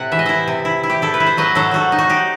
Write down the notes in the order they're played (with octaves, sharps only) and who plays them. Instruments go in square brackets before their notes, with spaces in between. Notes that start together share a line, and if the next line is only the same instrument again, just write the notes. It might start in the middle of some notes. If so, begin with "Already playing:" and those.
Already playing: [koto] A2 C3 C5 F#5
E3 E5
D#5
E4 C5 E5
C3
E4
E4
G4
E4 A4
B4
E4
C5
F#3 B4 D#5
F#3 A4 C5
F#3 F#4 A4
D#4
F#4
D#4 G4